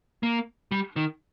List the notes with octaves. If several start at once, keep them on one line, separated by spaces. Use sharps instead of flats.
A#3
G3
D#3